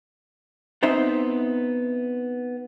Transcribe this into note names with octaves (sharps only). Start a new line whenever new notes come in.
B3 C4 D#4 C5 E5